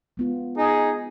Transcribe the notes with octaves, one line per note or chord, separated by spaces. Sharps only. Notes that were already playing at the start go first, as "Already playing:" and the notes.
G#3 B3 F4
D#4 G#4